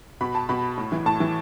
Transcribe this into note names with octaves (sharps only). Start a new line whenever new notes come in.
B2 B5
A5
B2 B5
A2
E3
A2 A5
E3